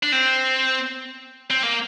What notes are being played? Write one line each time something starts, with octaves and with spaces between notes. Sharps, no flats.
D4
C4
C4
A#3